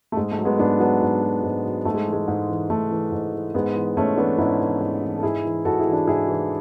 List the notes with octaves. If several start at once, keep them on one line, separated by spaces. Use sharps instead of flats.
A3
G#2 G#3
A3
F#3
G#3 B3
G#2 B3 D4
F#3 B3 D4
G#2
F#3
G#2
F#3
G#2 A3
G#3
E3
G#3
G#2
E3
G#2 A3
E3
G#2
E3
G#2 G#3 B3
E3
G#2 A3 C#4
E3 B3 D4
G#2 C#4 E4
E3
G#2
E3
A4
G#2 E4 G#4
E3
G#2 F#4 A4
E4 G#4
E3
D4 F#4
G#2 E4 G#4
E3